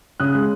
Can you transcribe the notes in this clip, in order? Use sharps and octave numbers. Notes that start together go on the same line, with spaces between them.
C#3 D#6 F#6
G#3